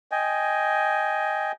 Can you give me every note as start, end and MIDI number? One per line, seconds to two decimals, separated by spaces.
0.11 1.52 75
0.11 1.52 79
0.11 1.52 80